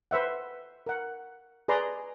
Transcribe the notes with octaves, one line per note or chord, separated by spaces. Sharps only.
B4 C5 E5 F#5
A#4 F#5
G#4 B4 D5 A#5 C6